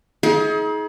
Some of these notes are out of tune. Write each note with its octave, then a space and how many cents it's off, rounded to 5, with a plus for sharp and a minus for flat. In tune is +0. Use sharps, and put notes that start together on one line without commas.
D#4 +40 G#4 +30